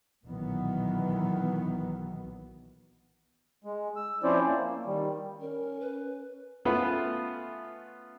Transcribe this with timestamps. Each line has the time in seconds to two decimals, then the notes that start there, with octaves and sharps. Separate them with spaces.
0.25 B1 A#2 D#3 E3 F#3 B3
3.64 G#3
3.96 E6
4.23 F3 C4 C#4 E4 C5 D5
4.46 A#3
4.86 D#3 G3
5.41 C#4 A#4
5.80 B4
6.65 A3 B3 C#4 F4 B4